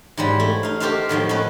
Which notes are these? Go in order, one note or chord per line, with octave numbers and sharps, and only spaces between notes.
G#2 E3 F#3 G3
A3 E4
D#4 F5
F#4 G4 A4 A#4 C5 F5
A2 D#3 F3 F#3
C#4 F#4 A4 B4